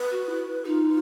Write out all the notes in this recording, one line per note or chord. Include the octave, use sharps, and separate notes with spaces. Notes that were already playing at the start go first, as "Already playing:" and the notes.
Already playing: B4
F#4
E4
D#4 F4